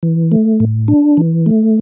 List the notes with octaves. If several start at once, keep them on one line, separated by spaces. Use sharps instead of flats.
E3
A3
A2
D4
E3
A3